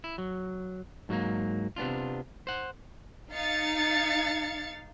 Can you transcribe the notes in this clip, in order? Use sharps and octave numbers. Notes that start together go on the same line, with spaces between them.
E4
F#3
G#2 F#3 G3 A#3
C3 B3 D4 F4
C5 F#5
D#4 F5 A6 C#7